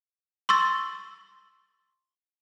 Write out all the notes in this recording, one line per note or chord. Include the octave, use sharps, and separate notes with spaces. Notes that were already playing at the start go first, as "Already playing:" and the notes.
C6 C#6 E6 A6